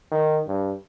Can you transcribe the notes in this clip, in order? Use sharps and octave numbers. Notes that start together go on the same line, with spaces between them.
D#3
G2